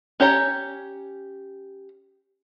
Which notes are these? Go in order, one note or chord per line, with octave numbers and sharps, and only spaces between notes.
C#4 G4 C#5 A#5